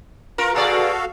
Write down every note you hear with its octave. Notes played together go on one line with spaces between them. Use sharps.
F4 A#4
B2 F#4 G#4 A4 D5 F5